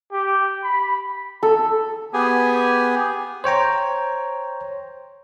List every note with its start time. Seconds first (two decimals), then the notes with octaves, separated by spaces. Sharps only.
0.12 G4
0.64 B5
1.43 A4
2.14 B3 G4 G#4 G#5
3.44 C5 C#5 G5 A#5